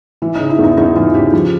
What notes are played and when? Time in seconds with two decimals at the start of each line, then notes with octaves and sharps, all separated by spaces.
0.22 E3 E4
0.35 C#3 D#4
0.50 E4
0.59 E2 D#4
0.77 E2 D#4
0.96 E3 F4
1.15 C#3 G4
1.33 F3